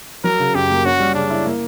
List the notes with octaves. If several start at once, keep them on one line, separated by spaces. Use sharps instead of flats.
F#3 A#4
C#3
F#2 G4
A#3
C#4 F#4
G3
C#3 D4
E4
A#3